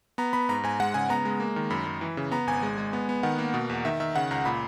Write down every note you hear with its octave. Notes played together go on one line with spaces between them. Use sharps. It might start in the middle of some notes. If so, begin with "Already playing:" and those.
B3 A#5
B3 B5
G#2 A#5
G#2 G#5
G#3 F#5
C#3 G#5
B3 A#5
G#3
A#3
D#3
F#2 B5
F#2
E3
C#3
B3 A#5
G#1 G#5
G#3
G#3
B3
B3
D#3 F#5
A#3
B2
E2
D#3 E5
D#3 E5
C#3 F#5
C#2 A#5
A#2 B5